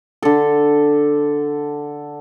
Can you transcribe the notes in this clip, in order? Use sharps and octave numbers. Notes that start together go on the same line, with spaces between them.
D3 A4